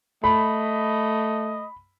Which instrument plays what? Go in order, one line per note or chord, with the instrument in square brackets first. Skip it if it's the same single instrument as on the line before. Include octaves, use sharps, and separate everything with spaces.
[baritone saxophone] A3 [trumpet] D#5 [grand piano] B5